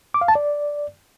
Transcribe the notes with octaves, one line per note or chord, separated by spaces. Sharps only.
D6
F5
A5
D5